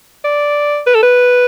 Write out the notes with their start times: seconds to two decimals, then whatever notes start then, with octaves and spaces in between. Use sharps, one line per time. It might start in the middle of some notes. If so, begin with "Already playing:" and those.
0.24 D5
0.87 B4
0.95 A4
1.02 B4